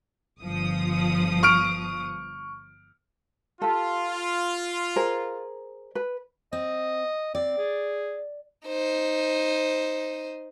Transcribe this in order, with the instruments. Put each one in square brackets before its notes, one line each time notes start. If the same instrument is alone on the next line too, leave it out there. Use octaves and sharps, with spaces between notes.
[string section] G1 F3 D#6
[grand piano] C#6 F6 D7
[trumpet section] F4 [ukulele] G4 A4
[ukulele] G#4 A#4 C5
B4
[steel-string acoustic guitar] C4 [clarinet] D#5
[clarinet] C4 [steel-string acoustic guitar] D5
[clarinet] G#4
[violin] D#4 C5